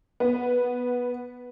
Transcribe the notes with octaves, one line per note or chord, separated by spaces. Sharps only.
B3